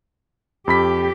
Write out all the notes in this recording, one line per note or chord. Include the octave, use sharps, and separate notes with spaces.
F2 G4 B5 B6